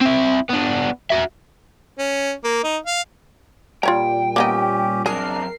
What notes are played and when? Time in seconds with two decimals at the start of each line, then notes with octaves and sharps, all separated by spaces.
0.01 C4 E4
0.49 B3 D4
1.10 F#4 E5
1.98 C#4
2.44 A#3
2.63 D#4
2.86 F5
3.83 A#2 G3 F4 C#5 G5 A#5
4.36 A#3 B3 C#4 D#4 G4
5.06 F#2 C4 D4 G#4 A#4 C7